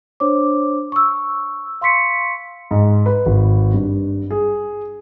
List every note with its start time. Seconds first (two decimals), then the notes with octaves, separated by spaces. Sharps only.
0.20 D4 C5 C#5 D6
0.92 C#6 E6
1.81 F5 C6 C#6 B6 C#7
2.71 G#2
3.06 B4
3.26 G#1
3.74 G2
4.31 G#4